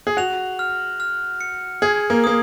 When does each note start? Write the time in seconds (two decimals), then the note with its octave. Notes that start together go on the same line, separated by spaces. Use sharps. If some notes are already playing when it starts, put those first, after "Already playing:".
0.07 G#4
0.17 F#4 F7
0.59 F6
1.00 F6
1.41 C#7
1.82 G#4 G#6
2.10 A#3
2.24 A#3 D#6